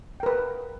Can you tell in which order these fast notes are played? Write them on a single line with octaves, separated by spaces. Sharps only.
G5 A#4 B4